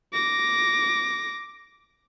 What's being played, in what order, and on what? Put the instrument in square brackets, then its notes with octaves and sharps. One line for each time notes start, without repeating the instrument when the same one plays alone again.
[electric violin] D6 A#6